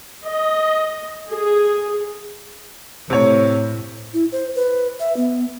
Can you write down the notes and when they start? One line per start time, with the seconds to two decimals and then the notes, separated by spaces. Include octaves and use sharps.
0.24 D#5
1.30 G#4
3.10 A2 C3 C#5
4.14 E4
4.32 C5
4.55 B4
5.00 E5
5.17 B3